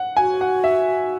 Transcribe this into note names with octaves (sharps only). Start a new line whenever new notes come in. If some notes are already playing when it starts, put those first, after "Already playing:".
Already playing: F#5
F#4 G#5
F#5
E5